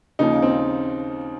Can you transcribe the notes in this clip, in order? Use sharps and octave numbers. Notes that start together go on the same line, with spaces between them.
D#2 C#3 F3 D#4
C4